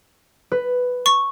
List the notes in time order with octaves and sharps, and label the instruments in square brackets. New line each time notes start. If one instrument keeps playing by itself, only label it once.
[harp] B4
[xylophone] C#6